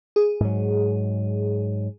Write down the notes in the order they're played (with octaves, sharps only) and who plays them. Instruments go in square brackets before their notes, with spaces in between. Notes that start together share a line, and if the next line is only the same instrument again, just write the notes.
[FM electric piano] G#4
[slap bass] G#2 F#3